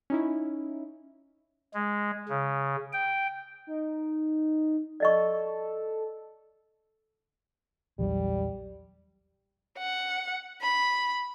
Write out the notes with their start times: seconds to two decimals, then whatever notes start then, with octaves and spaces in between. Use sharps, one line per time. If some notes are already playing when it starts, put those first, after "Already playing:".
0.10 C#4 D#4 E4
1.74 G#3
2.29 C#3
2.93 G5
3.67 D#4
5.00 A4 D5 D#5 C#6
7.99 A#1 E2 F#3 G3
9.78 F#5
10.62 B5